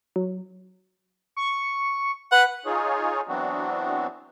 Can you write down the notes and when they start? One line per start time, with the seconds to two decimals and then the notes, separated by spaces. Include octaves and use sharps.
0.16 F#3
1.37 C#6
2.32 B4 F#5
2.66 D#4 F4 G#4 C#5
3.28 E3 F#3 B3 C4 D4 F#4